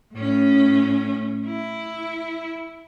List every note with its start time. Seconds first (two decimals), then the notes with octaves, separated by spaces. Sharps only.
0.15 A2 C#4
1.47 E4